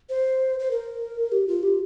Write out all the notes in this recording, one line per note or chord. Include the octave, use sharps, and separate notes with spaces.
C5
C5
A#4
G4
F4
G4